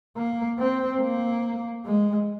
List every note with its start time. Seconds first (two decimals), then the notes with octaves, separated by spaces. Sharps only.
0.16 A#3
0.59 C4
1.01 A#3
1.85 G#3